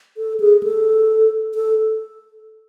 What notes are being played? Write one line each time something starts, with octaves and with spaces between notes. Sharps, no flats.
A4
G#4
A4
A4